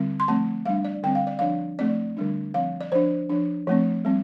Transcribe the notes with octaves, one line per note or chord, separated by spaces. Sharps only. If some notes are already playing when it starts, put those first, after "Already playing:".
Already playing: D3 G3 C4
C6
F3 A3 C4 A5
G3 D4 F5
D5
D3 G3 C4 G5
F5
D5
F3 D4 F5
F3 A3 C4 D5
D3 G3 D4
F3 C4 F5
D5
F3 D4 C5
F3 D4
F3 A3 C4
G3 C4